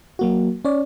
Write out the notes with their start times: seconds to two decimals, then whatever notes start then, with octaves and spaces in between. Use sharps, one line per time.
0.19 F#3 A#3 F#4
0.65 C#4 C#5 D5